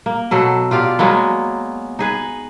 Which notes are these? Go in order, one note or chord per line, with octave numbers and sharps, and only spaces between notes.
A#3
B2 F#3 A4
F4 G4 D5 F5
F#3 G#3 A#3 B3
D#4 G#4 B4